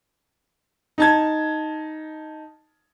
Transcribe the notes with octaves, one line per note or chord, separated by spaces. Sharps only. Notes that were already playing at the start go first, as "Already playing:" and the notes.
D#4 A5 G#6